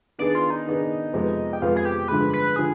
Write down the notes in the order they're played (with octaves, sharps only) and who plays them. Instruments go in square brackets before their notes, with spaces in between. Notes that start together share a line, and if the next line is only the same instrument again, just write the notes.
[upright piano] D#3 B3 D4 G#4 [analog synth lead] D5
[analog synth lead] F4
D#4
[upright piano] D#3 B3 D4 G#4
F2 C3 F3 G#3 B3
[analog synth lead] G4
[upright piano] F2 C3 F3 G#3 B3 [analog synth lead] F4
[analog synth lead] G#4
G4
[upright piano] G2 D3 F3 G#3 [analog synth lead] B4
[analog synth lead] B4
[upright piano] D3 F3 [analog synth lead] G#4